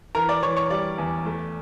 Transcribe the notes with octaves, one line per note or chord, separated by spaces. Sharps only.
E3 A#4 A#5
D5 D6
E3 C#5 C#6
C#5 C#6
G3 D5 D6
E2
A3